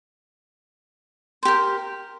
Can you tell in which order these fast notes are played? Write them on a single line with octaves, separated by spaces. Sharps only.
C5 G4 A#4